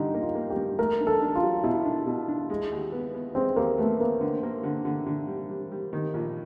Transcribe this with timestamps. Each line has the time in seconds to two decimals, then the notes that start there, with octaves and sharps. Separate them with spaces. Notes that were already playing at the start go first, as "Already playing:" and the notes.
Already playing: G2 D3 D#4 G4
0.14 A#3
0.21 F4
0.35 A#3
0.50 G4
0.57 G2
0.79 A3 A#4
1.00 D4
1.07 A4
1.22 D4
1.35 F4
1.43 F#3
1.64 B2 E4
1.85 D4
2.06 B2
2.28 D4
2.50 G#3
2.72 D#2
2.92 B3
3.14 B3
3.35 G#3 C4
3.56 D#2 A#3
3.78 A3 B3
4.00 A#3 B3
4.21 D3
4.43 A#3
4.63 D3
4.85 D3
5.07 D3
5.28 G3
5.49 G3
5.72 G3
5.93 D#3
6.14 A#1